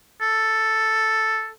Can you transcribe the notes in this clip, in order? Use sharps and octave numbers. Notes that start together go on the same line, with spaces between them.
A4